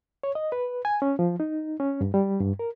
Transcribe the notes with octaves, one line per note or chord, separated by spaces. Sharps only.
C#5
D#5
B4
G#5
C#4
F3
D#4
C#4
G2
G3
G2
A#4